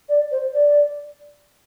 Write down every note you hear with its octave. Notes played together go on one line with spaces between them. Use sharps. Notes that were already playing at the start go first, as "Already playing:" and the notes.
D5
C5
D5